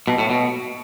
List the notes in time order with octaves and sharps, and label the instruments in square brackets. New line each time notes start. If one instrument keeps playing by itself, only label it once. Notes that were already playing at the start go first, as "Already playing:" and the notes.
[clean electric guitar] B2
A2
B2